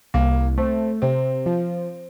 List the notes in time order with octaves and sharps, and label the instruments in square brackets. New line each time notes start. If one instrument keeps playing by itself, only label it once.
[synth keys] C2 [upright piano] A#3
[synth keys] A3 [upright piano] C4
[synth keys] C3 [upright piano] C4
[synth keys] F3